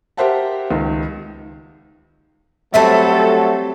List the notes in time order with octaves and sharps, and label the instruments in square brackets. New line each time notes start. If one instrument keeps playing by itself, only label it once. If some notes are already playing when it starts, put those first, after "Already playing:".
[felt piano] G4 A#4 C5 E5 F#5 A5
C#2 D#3
[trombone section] F#3 A3 [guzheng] G3 C4 F#4 [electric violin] A4 [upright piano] E5 A5